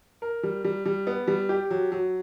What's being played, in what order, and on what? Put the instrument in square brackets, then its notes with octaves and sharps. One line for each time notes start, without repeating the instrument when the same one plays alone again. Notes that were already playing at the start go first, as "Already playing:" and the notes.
[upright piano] A#4
G3
G3
G3
B3
G3
G4
F#3
F#3